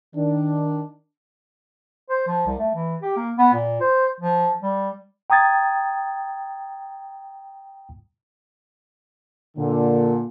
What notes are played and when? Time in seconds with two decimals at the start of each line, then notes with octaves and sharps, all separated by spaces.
0.14 D#3 D4
2.10 C5
2.27 F3
2.46 C2
2.58 A3
2.75 E3
3.02 G4
3.16 A#3
3.38 B3
3.53 A#2
3.80 C5
4.20 F3
4.63 G3
5.30 G5 A#5 D#6 G#6 A6
9.57 A#2 D3